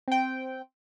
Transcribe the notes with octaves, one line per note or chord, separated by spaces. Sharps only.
C4 G5